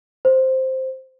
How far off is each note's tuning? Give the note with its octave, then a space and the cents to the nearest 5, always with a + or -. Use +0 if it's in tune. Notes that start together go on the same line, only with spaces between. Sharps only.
C5 +0